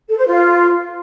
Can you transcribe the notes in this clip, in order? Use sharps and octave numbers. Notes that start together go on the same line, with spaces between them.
A4
C5
F4